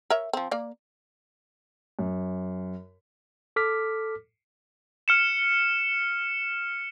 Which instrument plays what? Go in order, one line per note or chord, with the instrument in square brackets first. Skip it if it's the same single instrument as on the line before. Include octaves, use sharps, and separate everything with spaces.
[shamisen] A#4 C#5 E5
F3 C4
A#3 D5
[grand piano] F#2
[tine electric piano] A4 D6 F6 B6
[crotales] F6 C#7 E7